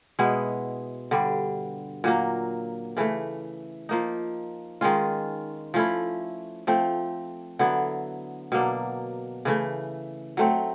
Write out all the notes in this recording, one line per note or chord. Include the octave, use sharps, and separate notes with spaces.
B2 G#3 B3 E4
G2 D3 G3
A#2 F#3 A#3
C#3 E3 A3
F3 A#3 D#4
D#3 G#3 C#4 F4
F3 A3 C#4 E4
F3 A3 C4
D3 F#3 B3 E4
B2 F#3 A#3 D4
C#3 E3 A3
F#3 A3 C4